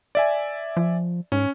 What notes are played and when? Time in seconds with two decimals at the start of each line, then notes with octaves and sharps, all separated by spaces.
0.15 D5 E5 G#5
0.77 F3
1.32 G#2 C#4